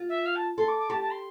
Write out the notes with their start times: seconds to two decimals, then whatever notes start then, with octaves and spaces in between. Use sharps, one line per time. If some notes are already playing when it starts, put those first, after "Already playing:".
Already playing: F4
0.09 E5
0.26 F5
0.36 A5
0.58 A4 C6
0.68 D6
0.79 D6
0.90 G4 A5
1.01 A5
1.11 C6